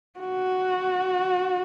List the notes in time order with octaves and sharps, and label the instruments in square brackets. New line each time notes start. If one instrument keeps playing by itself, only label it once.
[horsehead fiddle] F#4